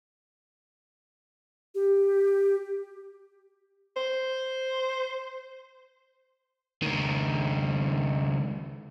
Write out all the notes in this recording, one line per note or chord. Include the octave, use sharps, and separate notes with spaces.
G4
C5
C#2 D#3